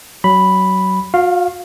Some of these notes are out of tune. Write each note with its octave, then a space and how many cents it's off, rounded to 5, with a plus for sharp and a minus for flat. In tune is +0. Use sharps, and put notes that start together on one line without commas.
F#3 +25 B5 +0
F#4 -45 F5 +0